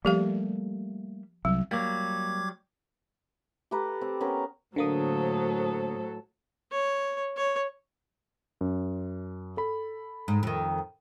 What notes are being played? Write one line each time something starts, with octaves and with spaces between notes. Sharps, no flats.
F3 G3 A3 A#3 G4 F5
C2 F#3
F#3 G3 A#3 D6 G#6
G4 A4 B4 A#5
C4
B3 C#4 A#4 B4
A2 D3 F#3 A#3 A4 C5 D#6
C#5
C#5
F#2
A4 B5
G#2
F2 D#3